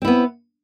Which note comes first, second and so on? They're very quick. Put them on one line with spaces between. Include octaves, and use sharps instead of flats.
C4 E4 B3